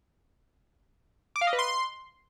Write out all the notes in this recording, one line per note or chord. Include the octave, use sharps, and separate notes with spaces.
D6
F5
D#5
B4
C6